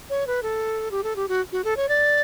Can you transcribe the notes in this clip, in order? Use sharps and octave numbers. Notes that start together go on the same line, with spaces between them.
C#5
B4
A4
G4
A4
G4
F#4
F#4
A4
C#5
D5